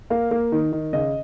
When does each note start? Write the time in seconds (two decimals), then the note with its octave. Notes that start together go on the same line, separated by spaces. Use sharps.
0.10 A#3 F5
0.31 A#3
0.52 D#3
0.73 D#3
0.93 C#3 D#5